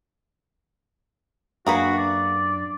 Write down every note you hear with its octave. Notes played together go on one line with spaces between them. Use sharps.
F#2 A#3 D4 F#4 G#4 B4
D5